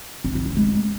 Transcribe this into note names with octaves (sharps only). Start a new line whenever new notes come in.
C4
E4
C#4
G#3